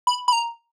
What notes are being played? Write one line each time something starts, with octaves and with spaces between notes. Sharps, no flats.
B5
B5
A#5